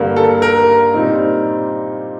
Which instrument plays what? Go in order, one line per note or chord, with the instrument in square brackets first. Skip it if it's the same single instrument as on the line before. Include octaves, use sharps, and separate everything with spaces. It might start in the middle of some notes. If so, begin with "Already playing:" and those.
Already playing: [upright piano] G2 D3 G3 A#3
[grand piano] A4
A#4
[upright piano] A#2 G3 C4 D#4